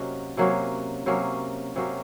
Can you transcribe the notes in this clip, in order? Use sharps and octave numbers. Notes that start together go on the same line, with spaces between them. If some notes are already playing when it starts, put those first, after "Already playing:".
Already playing: C3 F#3 A#3 C#4 D#5 F#5
C3 F#3 A#3 C#4
C3 F#3 A#3 C#4
C3 F#3 A#3 C#4